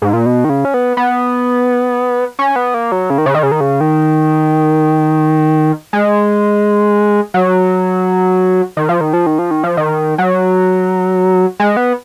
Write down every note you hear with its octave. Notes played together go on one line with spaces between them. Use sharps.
G#2
A#2
B2
D#3
C#3
C#4
B3
B3
C#4
B3
A#3
F#3
C#3
D#3
C#3
D#3
C#3
D#3
C#3
D#3
G#3
F#3
D#3
F3
D#3
F3
D#3
F3
D#3
F3
D#3
F#3
G#3
B3